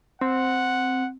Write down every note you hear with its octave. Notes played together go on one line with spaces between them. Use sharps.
C4 F#5